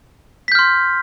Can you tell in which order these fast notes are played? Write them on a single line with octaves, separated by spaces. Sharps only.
B6 G6 F6 C6